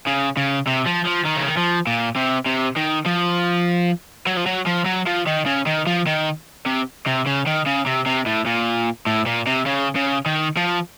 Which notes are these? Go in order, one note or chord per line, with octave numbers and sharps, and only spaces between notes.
C#3
C#3
C3
F3
F3
D#3
C#3
D#3
F3
A#2
C3
C3
D#3
F3
F#3
F3
F#3
F3
F#3
F3
D#3
C#3
D#3
F3
D#3
C3
C3
C#3
D#3
C#3
C3
C3
A2
A#2
A2
A#2
C3
C#3
C#3
D#3
F3